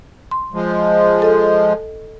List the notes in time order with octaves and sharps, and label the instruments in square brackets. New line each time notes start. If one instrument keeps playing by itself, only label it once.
[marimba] C6
[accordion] F3 G#3
[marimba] A4 D#5